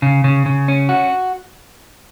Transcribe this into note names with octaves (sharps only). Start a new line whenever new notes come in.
C#3
C#3
C#3
C#4
F#4